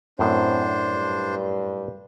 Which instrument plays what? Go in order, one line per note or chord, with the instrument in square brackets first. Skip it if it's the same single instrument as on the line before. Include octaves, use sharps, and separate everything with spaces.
[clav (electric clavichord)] F#2 A2 [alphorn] C4 [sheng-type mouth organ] D4 C5
[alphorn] G2